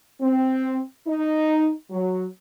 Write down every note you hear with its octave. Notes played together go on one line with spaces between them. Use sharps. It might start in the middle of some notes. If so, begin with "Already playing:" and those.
C4
D#4
F#3